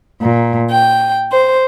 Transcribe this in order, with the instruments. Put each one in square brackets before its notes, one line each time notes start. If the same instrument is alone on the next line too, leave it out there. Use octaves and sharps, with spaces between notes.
[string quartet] A#2
G5
C5